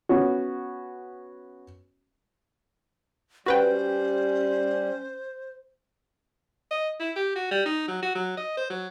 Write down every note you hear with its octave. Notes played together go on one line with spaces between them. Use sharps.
B3 C#4 F#4
G3 C#4 F#4 B4 C5 G5
D#5
E4
G4
F#4
G3
D#4
F#3
F#4
F#3
D#5
C5
F#3